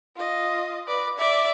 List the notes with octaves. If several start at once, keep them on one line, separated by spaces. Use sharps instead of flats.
F4 D#5
B4 D5
D5 E5